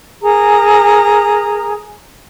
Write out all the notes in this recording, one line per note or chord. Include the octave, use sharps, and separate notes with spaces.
G#4 A#4 A#5